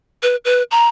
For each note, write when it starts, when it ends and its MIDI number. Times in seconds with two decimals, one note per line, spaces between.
0.23 0.36 71
0.45 0.63 71
0.71 0.88 82